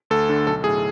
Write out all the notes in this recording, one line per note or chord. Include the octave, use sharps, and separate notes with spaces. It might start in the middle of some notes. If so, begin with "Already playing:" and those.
D2 A4
D3
B1 A4
A2 G#4